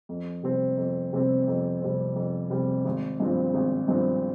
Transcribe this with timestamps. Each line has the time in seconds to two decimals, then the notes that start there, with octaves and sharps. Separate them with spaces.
0.09 F2
0.43 C3 G3 C4
0.77 F2
1.13 C3 G3 C4
1.48 F2
1.82 C3 G3 C4
2.16 F2
2.50 C3 G3 C4
2.85 G#1
3.20 G2 F3 C4
3.54 G#1
3.88 G2 F3 C4